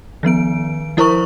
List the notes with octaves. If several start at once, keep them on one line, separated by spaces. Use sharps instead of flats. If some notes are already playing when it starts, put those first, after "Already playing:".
D#3 F3 B3 D7
F3 E4 A#4 C5 A#5 C#6